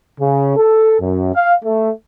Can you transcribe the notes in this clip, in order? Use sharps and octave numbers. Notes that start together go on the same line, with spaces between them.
C#3
A4
F#2
F5
A3